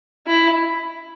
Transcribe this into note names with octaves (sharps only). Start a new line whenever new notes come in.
E4